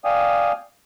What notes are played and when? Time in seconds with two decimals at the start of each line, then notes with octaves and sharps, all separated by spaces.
0.04 D5 F5 G5 G#5 D#6